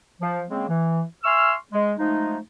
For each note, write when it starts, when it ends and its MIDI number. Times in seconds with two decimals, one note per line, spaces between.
0.21 0.43 53
0.50 0.68 49
0.50 0.68 56
0.50 0.68 58
0.50 0.68 60
0.69 1.02 52
1.24 1.53 76
1.24 1.53 80
1.24 1.53 84
1.24 1.53 85
1.24 1.53 88
1.24 1.53 89
1.73 1.93 56
1.99 2.37 53
1.99 2.37 56
1.99 2.37 57
1.99 2.37 63